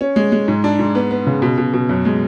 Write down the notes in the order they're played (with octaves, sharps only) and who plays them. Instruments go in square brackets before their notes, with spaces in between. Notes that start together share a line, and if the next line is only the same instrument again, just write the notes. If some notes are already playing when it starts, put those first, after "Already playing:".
[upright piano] C#4
G#3
G#3
G#2
D4
G#2
B3
B3
C#3
B2
B2
B2
F#2
G#3